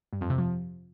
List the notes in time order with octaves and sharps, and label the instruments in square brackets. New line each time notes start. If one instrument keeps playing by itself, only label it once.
[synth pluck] G2
F2
C3
F3